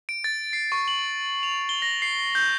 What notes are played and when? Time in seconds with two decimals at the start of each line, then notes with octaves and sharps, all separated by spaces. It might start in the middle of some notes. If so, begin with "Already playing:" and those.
0.09 D7
0.24 A6
0.53 C7
0.72 C#6
0.88 F#7
1.43 F7
1.69 G7
1.82 A#6
2.02 C7
2.35 G6